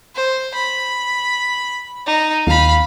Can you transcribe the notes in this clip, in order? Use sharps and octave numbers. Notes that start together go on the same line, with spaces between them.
C5
B5
D#4
D#2 F5 B5